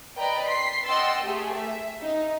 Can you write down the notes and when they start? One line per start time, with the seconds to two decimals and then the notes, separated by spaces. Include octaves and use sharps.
0.16 B4 D5 D#5 G5 A#5 B5
0.46 C6 B6 C7
0.85 D#5 F#5 G5 C6 E6 A6
1.22 A3 G4 G#4
1.54 E5
2.01 D#4